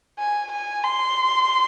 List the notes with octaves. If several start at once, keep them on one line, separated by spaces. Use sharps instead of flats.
G#5
G#5
C6